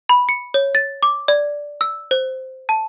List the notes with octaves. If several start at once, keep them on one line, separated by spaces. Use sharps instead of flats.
B5
C#7
C#5
A6
D6
D5
E6
C5
A5